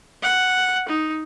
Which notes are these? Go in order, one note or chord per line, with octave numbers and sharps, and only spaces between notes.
F#5
D#4